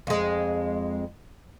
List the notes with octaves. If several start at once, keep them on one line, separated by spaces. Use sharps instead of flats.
F2 G#3